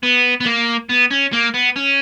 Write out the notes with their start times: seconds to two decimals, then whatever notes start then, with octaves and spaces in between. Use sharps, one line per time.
0.03 B3
0.41 B3
0.46 A#3
0.89 B3
1.11 C#4
1.33 A#3
1.54 B3
1.76 C#4